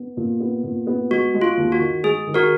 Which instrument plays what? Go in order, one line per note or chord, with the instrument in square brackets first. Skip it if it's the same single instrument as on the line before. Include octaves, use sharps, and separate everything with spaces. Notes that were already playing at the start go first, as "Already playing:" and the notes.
Already playing: [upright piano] B3
A#2
B3
A#2
B3
[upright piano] G#3 [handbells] F#4
[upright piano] G#3
[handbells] F4
[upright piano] D#2
[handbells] F#4
[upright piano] D#3
[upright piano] G#3 [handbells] G#4
[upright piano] D#3
[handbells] F#4 A#4